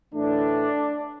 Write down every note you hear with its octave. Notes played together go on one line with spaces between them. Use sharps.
A2 E3 A3 D4